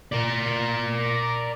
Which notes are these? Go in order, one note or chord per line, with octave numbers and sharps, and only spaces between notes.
A#4 D5